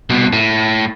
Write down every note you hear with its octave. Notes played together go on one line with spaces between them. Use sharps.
C2 B2
A2